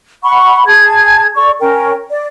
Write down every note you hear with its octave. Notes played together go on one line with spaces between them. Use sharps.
F#5 B5 C#6
G#4 A5 G#6
A4 D5 C#6
C#4 A#4 G5
D5